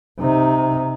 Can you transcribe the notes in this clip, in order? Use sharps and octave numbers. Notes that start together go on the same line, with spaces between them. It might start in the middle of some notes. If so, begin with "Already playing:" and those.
C3 D#4